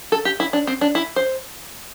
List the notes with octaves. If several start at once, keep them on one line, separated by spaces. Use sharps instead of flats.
A4
G4
E4
D4
C4
D4
E4
C5